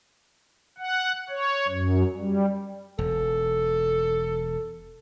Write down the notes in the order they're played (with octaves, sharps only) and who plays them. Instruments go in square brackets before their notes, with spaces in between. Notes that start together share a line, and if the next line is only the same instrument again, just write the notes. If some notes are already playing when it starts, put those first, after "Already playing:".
[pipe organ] F#5
C#5
F#2
G3
[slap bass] E1 [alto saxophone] A4